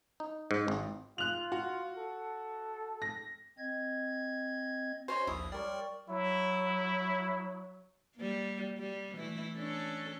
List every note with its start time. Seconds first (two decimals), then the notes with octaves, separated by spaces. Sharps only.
0.20 D#4
0.51 G#2
0.68 G#1
1.18 F4 F#6 F7
1.52 F#4
1.97 A4
3.02 A#6
3.58 C4 D#5 G#6
5.08 C#4 F#4 C5 C#5 D#5
5.27 A#1 D#2 E4 D#6
5.52 G3 A#4 C#5 D5 C6
6.09 F#3 E4
8.17 G3 A#3
8.78 G3
9.17 E3 A3 E4
9.57 C#4 D4 A4